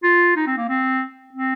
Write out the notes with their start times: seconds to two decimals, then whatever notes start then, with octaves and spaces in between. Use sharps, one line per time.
0.03 F4
0.36 D#4
0.47 C4
0.57 A#3
0.68 C4
1.33 C4